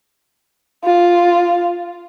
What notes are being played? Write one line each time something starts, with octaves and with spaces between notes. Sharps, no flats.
F4